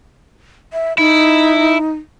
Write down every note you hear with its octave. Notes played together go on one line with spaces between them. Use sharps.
E5
D#4 E4